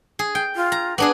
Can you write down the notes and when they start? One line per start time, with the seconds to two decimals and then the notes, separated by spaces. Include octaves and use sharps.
0.19 G#4
0.35 G5
0.56 F4
0.72 A#5
0.98 B3 D4 G#4 D6